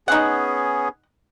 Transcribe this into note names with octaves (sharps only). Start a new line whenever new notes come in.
B3 C#4 D#4 G#4 F#5